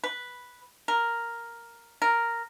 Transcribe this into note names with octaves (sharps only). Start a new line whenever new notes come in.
B4
A#4
A#4